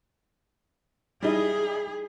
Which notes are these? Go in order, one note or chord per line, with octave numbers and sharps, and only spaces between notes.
G3 D#4 E4 G#4